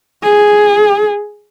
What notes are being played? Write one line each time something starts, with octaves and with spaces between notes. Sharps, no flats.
G#4